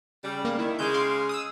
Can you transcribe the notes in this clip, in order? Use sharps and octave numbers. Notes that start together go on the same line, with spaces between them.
C#3 G3
A#3
D#3 E4
C#3 G#3 G6
F5 C6 D6
D#6 E6